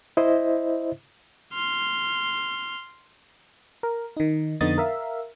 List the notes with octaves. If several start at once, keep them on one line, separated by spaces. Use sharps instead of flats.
E4 C5 D#5 E5
C6 F6
A#4
D#3 D#4
F2 D3 B3 D#4 D#6 A6
A#4 E5 F5